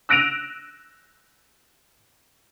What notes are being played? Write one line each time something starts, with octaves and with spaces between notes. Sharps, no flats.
E6 F#6 A#6 D7 D#7 F7